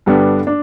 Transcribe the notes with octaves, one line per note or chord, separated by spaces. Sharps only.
G2 D3 G3 B3 D4
D4